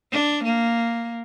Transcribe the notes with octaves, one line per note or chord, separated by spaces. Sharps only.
D4
A#3